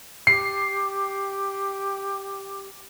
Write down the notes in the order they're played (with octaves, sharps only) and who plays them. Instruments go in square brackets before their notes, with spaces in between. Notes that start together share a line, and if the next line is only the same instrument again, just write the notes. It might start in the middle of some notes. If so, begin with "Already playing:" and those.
[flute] G4 [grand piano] C7